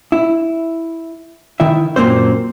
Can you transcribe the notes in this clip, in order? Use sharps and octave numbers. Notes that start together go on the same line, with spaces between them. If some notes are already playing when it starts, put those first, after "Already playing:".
E4
D#3 E4 E5
F#2 A#2 A#3 C4 C5